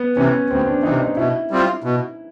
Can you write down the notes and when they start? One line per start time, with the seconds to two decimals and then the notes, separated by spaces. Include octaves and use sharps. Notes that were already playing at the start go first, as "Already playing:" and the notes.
Already playing: B3
0.17 C3 E3 C#4
0.50 D2 C4
0.67 D4
0.83 C3 E3 D#4
1.00 D#4
1.17 B2 E4
1.51 G3 C4 F4
1.84 B2